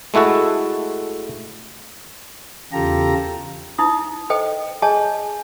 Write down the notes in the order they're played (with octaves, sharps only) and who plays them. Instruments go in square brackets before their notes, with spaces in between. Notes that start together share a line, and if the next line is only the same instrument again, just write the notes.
[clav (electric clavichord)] G#3 A3 E4 F#4 A4
[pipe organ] E2 C#3 F4 G4 A4 A#5
[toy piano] D#4 E4 D#6
A4 C5 D#5 G5
G#4 C#5 D#5 G#5 A5